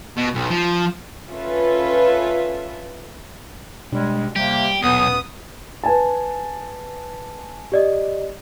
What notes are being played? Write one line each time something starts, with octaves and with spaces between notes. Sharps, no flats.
B2
B1
F3
C#4 F4 A4 B4 E5
B2 G3 G#3 D4
C3 G3 A#3 G4
D#1 B1 B3 D#6
B4 G#5 A5
G4 D5 D#5